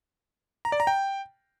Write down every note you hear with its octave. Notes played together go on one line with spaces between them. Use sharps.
A#5
D5
A#5
G5